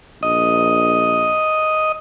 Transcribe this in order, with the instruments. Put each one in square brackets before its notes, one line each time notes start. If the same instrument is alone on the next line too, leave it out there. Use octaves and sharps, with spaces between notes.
[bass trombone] A#1 [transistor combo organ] D#5